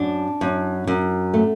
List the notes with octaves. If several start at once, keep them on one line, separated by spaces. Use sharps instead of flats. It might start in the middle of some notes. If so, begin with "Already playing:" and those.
Already playing: F#2 D4
F#2
F#2
A3